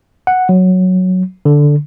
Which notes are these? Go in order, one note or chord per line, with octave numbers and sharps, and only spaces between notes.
F#5
F#3
D3